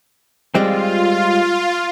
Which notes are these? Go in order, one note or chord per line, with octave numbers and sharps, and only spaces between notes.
G3 G#3 C4 F4